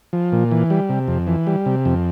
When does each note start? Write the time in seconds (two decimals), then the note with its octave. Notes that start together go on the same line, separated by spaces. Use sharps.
0.13 F3
0.32 A#2
0.51 E3
0.70 G3
0.89 C3
1.08 F2
1.27 E3
1.47 G3
1.66 C3
1.85 F2